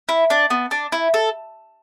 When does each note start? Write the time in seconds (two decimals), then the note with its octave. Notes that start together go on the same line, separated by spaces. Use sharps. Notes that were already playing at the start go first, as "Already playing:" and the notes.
0.09 E4
0.30 D4
0.50 B3
0.71 D4
0.92 E4
1.14 A4